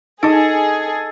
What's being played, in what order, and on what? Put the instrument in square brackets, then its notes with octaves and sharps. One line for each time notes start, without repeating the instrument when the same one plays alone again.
[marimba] D#4 [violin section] G#4 [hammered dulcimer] A4 D#5